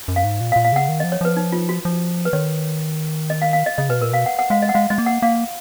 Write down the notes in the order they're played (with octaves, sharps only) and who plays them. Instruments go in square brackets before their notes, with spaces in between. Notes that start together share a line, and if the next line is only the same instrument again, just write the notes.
[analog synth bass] F#2
[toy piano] F5
[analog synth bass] G#2
A#2
[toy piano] F5
[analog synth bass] A#2
[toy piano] F5
[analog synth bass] C#3 [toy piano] F#5
[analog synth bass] D#3
[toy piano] D#5
[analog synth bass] F3
[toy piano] C#5
[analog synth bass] F3 [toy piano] B4
[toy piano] D#4
F4
F#4
[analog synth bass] F3
[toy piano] B4
[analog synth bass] D#3 [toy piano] C#5
[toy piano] D#5
F5
F5
D#5
[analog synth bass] C#3 [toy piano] D#5
[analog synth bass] B2 [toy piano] B4
[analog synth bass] A#2 [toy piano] A#4
[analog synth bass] B2 [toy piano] F5
[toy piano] F#5
F#5
[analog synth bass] G#3 [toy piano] F5
[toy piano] D#5
F#5
[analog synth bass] G#3 [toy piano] F5
[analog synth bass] G#3 [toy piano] D#5
[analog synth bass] A#3
[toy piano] F#5
[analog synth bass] A#3 [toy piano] F5